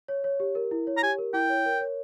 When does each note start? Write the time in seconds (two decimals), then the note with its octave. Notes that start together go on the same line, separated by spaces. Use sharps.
0.08 C#5
0.24 C#5
0.40 G4
0.55 A#4
0.71 E4
0.87 C#5
0.97 A#5
1.03 G4 G#5
1.18 A#4
1.34 E4 G5
1.49 C#5
1.66 A#4
1.81 C#5